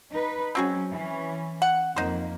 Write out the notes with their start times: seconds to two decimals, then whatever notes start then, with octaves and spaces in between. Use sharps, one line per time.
0.11 D#4 B4
0.55 F#3 C4 C#4 F#4 G#4
0.90 E3 C#4
1.62 F#5
1.96 F2 A#3 D#4 C5